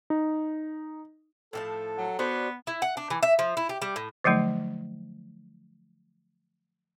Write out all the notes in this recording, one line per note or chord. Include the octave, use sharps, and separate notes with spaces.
D#4
A2 F3 A4 A5
F#3
B3 D4 F#4 C5
E4
F#5
D4
E3
E5
F3
E4
G4
G3
A2
D3 F3 F#3 A3 D#4